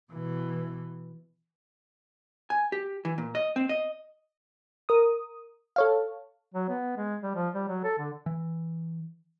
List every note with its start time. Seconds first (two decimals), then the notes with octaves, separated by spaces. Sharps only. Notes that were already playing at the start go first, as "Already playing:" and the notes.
0.12 B2 E3
2.50 G#5
2.72 G4
3.05 E3
3.18 A#2
3.35 D#5
3.56 C4
3.69 D#5
4.89 A#4 D#6
5.76 A4 C#5 F5
6.54 F#3
6.69 B3
6.97 G#3
7.23 G3
7.36 F3
7.55 G3
7.68 F#3
7.84 A4
7.99 D3
8.26 E3